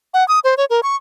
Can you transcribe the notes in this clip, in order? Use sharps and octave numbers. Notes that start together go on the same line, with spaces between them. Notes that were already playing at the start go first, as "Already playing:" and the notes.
F#5
D#6
C5
C#5
A#4
C#6